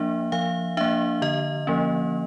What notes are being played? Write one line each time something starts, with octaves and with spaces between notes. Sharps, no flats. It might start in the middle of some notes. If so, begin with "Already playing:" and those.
Already playing: F3 A#3 D4 E5
F3 F5
A#3 D4 E5
D3 D#5
F3 A#3 C#4